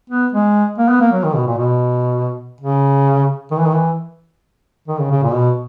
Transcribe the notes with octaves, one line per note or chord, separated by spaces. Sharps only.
B3
G#3
A#3
B3
A#3
F#3
D#3
B2
A#2
B2
C#3
D#3
E3
D#3
E3
D#3
C#3
C#3
A#2
B2